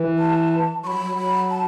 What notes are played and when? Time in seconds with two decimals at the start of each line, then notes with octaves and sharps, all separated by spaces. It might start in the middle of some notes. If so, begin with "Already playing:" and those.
Already playing: E3
0.19 A5
0.84 F#3 C#6
0.87 B5
0.95 F#3
1.06 F#3
1.17 F#3 B5
1.50 A5